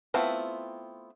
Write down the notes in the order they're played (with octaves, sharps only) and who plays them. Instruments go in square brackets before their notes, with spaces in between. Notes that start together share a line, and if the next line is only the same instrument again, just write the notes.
[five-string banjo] A3 B3 C4 E4 F4